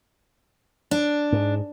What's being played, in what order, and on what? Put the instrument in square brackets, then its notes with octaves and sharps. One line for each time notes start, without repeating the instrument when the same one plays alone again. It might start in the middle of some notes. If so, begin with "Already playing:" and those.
[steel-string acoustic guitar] D4
[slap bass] G#2